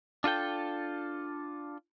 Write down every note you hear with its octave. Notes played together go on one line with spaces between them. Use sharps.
D4 F4 A4 G5